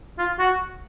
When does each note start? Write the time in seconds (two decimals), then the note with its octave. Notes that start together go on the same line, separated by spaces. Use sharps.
0.19 F4
0.39 F#4